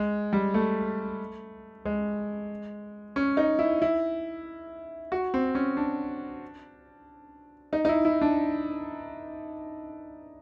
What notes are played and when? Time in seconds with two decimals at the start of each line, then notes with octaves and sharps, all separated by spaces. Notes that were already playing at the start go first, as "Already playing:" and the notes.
Already playing: G#3
0.33 G3
0.54 A3
1.85 G#3
3.16 C#4
3.37 D#4
3.59 E4
3.82 E4
5.12 F#4
5.34 C4
5.55 C#4
5.77 D4
7.73 D#4
7.85 D#4
7.89 E4
8.05 E4
8.22 D4